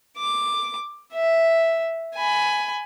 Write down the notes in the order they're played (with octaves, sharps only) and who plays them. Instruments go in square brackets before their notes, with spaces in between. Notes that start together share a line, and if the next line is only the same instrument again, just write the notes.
[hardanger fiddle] D6
E5
G#5 B5